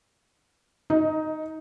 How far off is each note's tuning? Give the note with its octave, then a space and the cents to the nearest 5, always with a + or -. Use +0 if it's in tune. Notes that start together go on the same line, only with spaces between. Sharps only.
D#4 +0 D#5 +20